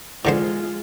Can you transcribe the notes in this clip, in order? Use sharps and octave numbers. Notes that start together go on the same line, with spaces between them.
G#2 D3 G#3 F4 C5